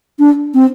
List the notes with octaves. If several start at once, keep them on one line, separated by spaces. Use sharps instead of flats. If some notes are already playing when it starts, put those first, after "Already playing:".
D4
C4